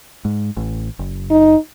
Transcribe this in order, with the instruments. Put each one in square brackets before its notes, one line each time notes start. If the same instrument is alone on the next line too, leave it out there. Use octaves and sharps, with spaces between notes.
[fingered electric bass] G#2
A1
F#1
[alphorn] D#4